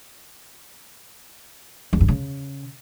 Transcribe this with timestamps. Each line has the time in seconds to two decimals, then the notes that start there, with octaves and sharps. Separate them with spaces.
1.93 E2
2.01 G2
2.08 C#3